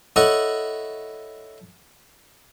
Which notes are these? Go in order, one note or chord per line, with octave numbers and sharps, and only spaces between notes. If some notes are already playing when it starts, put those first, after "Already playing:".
E4 A4 C#5 D#5 F#5